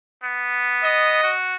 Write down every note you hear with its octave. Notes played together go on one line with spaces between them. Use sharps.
B3
D#5
F#4